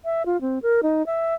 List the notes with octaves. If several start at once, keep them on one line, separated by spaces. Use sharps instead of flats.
E5
F4
C4
A#4
D#4
E5